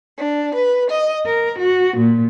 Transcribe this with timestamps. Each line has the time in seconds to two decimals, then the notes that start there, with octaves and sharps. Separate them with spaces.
0.18 D4
0.55 B4
0.89 D#5
1.25 A#4
1.58 F#4
1.97 A#2